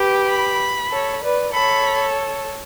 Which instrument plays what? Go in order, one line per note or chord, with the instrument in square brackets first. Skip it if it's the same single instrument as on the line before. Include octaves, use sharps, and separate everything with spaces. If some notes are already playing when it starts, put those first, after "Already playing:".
Already playing: [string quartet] G4 B4
[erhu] B5
[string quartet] A4 C#5
B4 D5
[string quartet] A4 C#5 [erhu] B5